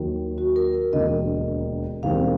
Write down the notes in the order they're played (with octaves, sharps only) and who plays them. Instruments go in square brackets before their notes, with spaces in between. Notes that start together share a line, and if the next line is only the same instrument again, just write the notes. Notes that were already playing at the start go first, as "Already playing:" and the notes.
Already playing: [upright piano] D#2 D#3 F#3
[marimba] F#4
A#4
[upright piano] E1 D#2 D3 [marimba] D#5
[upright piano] E1 D#2 D#3 G3 C4 [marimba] F5